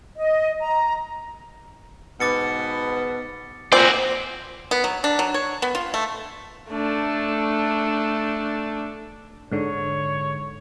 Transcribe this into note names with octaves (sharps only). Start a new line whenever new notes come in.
D#5
A#5
G#2 B2 B3 D6 A6 C#7
A#2 C4 F#4 D5 G#5 C7 F#7
B3
F#3
D4
F#3
C#5
B3
F4
A3
A3 D4
G#2 D3 C#5